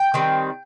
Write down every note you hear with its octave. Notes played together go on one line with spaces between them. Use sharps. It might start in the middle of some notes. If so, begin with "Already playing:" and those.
Already playing: G5
D#3 G3 C4